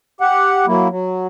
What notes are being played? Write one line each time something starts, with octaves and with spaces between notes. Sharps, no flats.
G4 F#5
F#3 A#3 E4
F#3